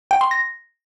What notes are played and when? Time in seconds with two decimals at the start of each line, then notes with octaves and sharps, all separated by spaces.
0.11 G5
0.21 C6
0.31 A#6